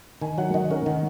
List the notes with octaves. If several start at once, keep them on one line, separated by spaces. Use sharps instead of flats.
D#3 G#5
F#3 F#5
D#3 D#5
C#4 A#4
D#3